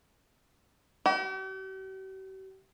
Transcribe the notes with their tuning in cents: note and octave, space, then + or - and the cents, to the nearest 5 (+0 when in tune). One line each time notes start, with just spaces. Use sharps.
G4 -45